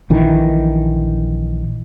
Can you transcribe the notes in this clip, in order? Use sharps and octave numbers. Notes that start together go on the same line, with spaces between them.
A#1 D#3 E3